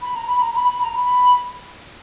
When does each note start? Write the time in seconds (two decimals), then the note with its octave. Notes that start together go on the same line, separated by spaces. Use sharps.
0.01 B5
0.14 A#5
0.27 B5
0.41 A#5
0.54 B5
0.68 B5
0.81 A#5
0.95 B5